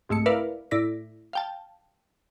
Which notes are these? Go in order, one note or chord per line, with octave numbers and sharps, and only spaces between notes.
C2 G#2 A3 C#7
E4 A#4 B4 D5 E5 F5
A2 E4 D5 A#6 B6
F5 G5 A5